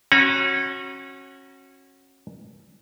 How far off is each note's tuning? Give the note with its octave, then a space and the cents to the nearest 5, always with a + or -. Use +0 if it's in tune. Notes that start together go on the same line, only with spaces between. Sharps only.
C#4 -25 F#4 +0 A#5 +45